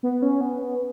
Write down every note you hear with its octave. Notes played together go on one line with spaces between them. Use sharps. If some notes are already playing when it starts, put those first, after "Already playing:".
B3
C#4
B3